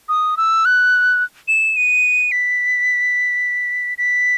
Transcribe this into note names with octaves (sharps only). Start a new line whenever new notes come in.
D#6
E6
F#6
E7
D#7
B6
B6